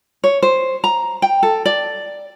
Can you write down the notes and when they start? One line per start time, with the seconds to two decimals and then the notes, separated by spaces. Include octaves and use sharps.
0.24 C#5
0.42 C5
0.84 A#5
1.22 G5
1.43 A4
1.66 D5